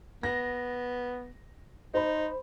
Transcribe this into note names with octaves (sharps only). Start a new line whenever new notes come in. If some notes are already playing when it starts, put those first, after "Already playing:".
B3 A#6
D#4 C5 B5